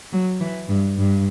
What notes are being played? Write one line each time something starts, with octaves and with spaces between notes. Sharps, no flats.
F#3
E3
G2
G2